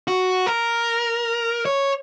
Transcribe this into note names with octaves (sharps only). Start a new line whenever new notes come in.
F#4
A#4
C#5